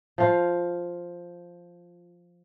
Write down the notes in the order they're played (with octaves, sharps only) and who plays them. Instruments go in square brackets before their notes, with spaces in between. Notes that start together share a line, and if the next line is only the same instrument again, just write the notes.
[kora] F3 F4